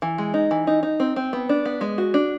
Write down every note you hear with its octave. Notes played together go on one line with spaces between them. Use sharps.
E3
G#3
D#4
E3
D#4
D#4
C4
C4
B3
D4
B3
G#3
F#4
D4